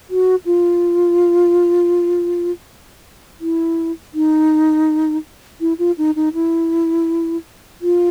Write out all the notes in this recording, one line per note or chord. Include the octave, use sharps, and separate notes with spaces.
F#4
F4
E4
D#4
E4
F4
D#4
D#4
E4
F4